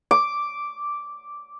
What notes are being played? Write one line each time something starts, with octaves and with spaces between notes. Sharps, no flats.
D6